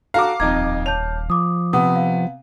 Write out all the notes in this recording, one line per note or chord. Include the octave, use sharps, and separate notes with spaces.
F#4 A4 F5 A#5 D6
D#1 F2 D#4 A#5 G#6
C#5 A5 G6 F7
F3 D6 D#6
C3 B3 D#6
F5